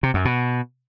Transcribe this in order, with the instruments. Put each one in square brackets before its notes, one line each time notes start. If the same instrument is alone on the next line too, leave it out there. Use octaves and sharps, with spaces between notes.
[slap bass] C3
F#2
B2